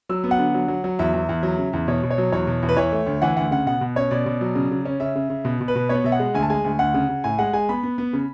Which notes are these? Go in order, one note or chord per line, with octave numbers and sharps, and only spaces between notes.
F#3 E6
B3
F#5
D3
F#3
F#3
F#3
E2 E5
E2
E2
F#3
C#3
E2
B2 C#5
B2
C#5
F#3
E2 C#5
B2
E2
B4
E3 C#5
A3
D2
E3 F#5
D2 F#5
C#3 F#5
B2 F#5
B2
C#4 C#5
B2 D5
B2
F#3
C#3
C#3
C#4
C#3 E5
C#3
C#3
B2
B2
B4
B2
B3 C#5
B2 E5
F#5
G#3
D2 G#5
A5
G#3 G#5
D2
D2 F#5
C#3
C#3
A2 G#5
G#3 F#5
G#3 G#5
B3 B5
B3
B3
C#3